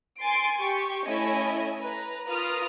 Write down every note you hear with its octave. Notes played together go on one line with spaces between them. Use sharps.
G#5 C6 A6 C7 D7
G4 C#6
A3 C#4 E4 D#5 G#5
B4 A#5
F4 A#4 B4 D#6 F6